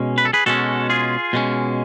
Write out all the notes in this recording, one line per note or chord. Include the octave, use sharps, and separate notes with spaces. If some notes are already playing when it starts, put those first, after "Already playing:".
Already playing: B2 G#3 C#4
B4
A4
G#4 B4
B2 G#3 C#4 F#4 A4
F4 G#4
B2 G#3 C#4